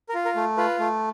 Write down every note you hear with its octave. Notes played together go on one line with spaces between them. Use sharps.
A#4
F4
A#4
A3
F4 B4
A3